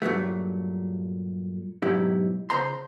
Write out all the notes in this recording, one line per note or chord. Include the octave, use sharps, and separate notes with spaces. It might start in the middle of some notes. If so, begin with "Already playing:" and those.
G2 A#2 F#3 A3
B1 G#2 F#3 E4 G4
C#3 C5 A#5 C6